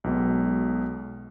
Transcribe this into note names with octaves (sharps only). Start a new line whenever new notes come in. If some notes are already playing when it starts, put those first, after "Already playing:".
B1 B2 G#3